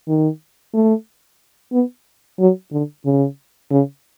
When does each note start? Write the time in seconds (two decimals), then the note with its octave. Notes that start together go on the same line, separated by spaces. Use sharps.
0.08 D#3
0.74 A3
1.73 B3
2.40 F#3
2.72 D3
3.05 C#3
3.71 C#3